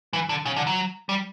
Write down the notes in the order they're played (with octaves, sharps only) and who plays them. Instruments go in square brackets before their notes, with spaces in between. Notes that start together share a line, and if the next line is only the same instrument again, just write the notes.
[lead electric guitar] E3
D3
C#3
D3
F#3
G3